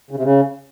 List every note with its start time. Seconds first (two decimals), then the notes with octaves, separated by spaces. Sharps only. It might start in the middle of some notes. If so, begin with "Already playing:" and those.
0.11 C#3
0.17 C3
0.23 C#3